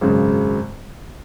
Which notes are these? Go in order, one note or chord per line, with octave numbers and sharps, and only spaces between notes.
G#1 F#2 C#3 G#3